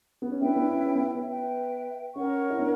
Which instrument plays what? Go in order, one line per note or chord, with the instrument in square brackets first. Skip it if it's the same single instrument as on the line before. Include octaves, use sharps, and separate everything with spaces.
[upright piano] B3
C#4
[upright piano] B3 D4 [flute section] E4 B4 E5 G5
[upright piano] B3 D4
C#4
C#4
B3
B3
[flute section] B4 E5 G5
[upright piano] C#4 [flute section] A#4 C#5 F#5 C#6
[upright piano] E4
B3 D4